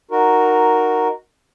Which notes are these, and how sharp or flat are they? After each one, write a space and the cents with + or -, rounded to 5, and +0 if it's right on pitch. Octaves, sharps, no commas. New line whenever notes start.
D#4 +0 F#4 +0 A#4 +0